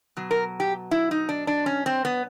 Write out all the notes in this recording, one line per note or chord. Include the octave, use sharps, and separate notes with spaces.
B2 F#3
A#4
G4
E4
D#4
D4
D4
C#4
C4
B3